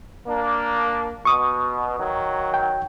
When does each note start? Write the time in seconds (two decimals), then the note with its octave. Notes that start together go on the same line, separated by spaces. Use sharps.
0.27 A#3 D4
1.25 B2 C#6 D#6
1.98 D#3 F#3
2.54 G5